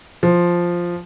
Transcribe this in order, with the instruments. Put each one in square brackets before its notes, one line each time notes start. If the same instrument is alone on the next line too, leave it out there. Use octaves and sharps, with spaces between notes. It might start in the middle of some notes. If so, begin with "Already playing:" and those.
[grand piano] F3